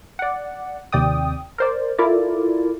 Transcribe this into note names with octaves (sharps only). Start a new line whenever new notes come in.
D5 F#5
D#2 C3 D5 G5 D#6
A#4 C5 D5
E4 F4 A4 A#4 D5